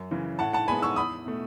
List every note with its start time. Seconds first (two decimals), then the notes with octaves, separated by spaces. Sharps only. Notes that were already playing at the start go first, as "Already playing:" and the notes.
Already playing: F#2
0.11 C#3 E3
0.39 A2 F#5 A5
0.53 F#5 A5
0.68 G#3 B3 G#5 B5
0.82 C#6 E6
0.96 E2 B5 D#6
1.26 B2 A3